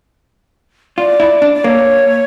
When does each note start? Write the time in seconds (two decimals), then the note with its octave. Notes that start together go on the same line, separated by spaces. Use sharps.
0.98 F4 D5
1.20 E4
1.42 D4
1.54 D5
1.64 A#3 C#5